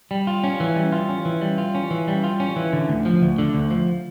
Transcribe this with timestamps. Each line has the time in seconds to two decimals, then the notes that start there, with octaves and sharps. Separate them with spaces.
0.11 G3
0.27 F4
0.44 C#4
0.60 E3
0.76 G3
0.92 F4
1.09 C#4
1.25 E3
1.41 G3
1.58 F4
1.75 C#4
1.90 E3
2.08 G3
2.24 F4
2.40 C#4
2.56 E3
2.73 D3
2.89 D2
3.05 F3
3.22 D2
3.39 D3
3.54 D2
3.71 F3